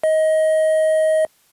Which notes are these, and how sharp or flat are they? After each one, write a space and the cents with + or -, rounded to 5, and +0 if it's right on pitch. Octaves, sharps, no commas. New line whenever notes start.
D#5 +20